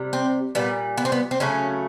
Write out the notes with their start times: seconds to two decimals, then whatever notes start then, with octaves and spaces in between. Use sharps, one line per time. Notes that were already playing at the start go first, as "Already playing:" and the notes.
Already playing: C3 G3
0.13 C4
0.55 A#2 G3 B3
0.98 B3
1.05 C4
1.12 B3
1.31 C4
1.40 C#3 F#3 A3 C#4